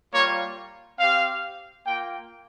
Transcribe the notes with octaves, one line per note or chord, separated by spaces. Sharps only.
G3 A#3 F4 C#5
C4 G4 F5
A#3 F4 G5